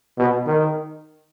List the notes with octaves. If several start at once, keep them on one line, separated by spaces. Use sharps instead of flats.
B2
D#3